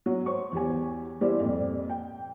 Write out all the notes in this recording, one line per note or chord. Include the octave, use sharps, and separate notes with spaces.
F#3
C5 C#5 C#6
E2 G4 G#5
G3 A#3 E4 G4 C5 D5
F2 A#2
G5